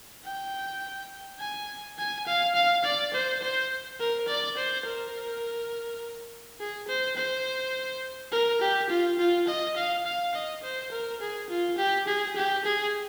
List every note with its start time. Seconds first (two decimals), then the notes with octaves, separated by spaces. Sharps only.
0.25 G5
1.40 G#5
1.98 G#5
2.26 F5
2.55 F5
2.84 D5
3.13 C5
3.42 C5
3.99 A#4
4.28 D5
4.57 C5
4.86 A#4
6.60 G#4
6.88 C5
7.16 C5
8.32 A#4
8.61 G4
8.89 F4
9.19 F4
9.47 D#5
9.76 F5
10.06 F5
10.34 D#5
10.63 C5
10.91 A#4
11.21 G#4
11.49 F4
11.78 G4
12.07 G#4
12.36 G4
12.65 G#4